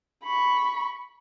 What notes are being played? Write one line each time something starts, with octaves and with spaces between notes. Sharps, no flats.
B5 C#6